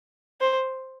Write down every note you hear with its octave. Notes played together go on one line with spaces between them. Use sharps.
C5